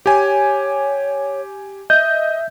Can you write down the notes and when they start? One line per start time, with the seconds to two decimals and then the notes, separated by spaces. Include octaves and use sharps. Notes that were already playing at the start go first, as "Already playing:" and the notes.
0.06 G4 C#5 G#5
1.90 D#5 E5 G6